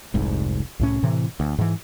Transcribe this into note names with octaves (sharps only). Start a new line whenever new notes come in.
F1 C2 G#2
C2 A2 C#4
A2 C3 E3
D2
G#2 E3